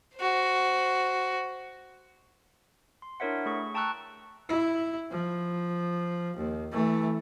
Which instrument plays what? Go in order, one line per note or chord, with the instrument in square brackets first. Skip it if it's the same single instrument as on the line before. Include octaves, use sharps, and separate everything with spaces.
[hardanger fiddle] F#4 C5
[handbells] C6
D4 E4 A#4 C#5 E5 F#5
A3 G#4 C#6
G5 A5 A#5 C#6 E6 F#6
[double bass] E4
F3
D#2
E3 A3